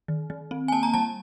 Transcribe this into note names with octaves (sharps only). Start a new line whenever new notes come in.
D#3
D#3
C4
G#5
A#3 A5
A#5
G3 A5